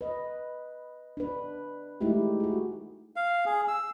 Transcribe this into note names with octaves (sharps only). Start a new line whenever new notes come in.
B4 D#5
D4 B4
G#3 A3 D#4 E4 G4
F#4 G#4
F5
G#4
E6